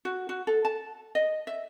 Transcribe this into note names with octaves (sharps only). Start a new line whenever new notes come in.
F#4
F#4
A4
A5
D#5
E5